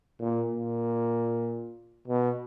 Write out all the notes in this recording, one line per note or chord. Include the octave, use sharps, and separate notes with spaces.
A#2
A#2
B2